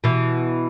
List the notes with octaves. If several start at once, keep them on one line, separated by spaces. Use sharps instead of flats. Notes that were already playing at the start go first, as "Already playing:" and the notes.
B2 E3